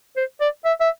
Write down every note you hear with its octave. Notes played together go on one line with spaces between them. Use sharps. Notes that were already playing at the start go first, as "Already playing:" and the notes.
C5
D5
E5
E5